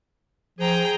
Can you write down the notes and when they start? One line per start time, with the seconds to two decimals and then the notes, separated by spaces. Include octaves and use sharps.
0.59 F3 G#4 G5 A#5